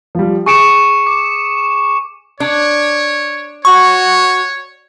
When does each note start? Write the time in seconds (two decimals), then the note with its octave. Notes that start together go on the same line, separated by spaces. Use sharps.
0.15 F3 G3
0.46 G#4 C#6 C#7 D7 E7
1.07 D6
2.40 D4 C#5
3.65 F#4 C#5 C#6